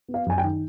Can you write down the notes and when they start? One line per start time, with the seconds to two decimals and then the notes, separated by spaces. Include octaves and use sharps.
0.08 B3
0.14 F5
0.26 F#2 G#5
0.38 G5
0.44 D#3